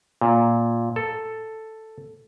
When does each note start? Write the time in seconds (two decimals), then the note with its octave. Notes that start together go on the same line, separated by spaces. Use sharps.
0.21 A#2
0.96 A4